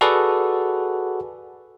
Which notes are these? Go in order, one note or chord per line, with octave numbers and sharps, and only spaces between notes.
F#4 G#4 A4 B4 D5 F#5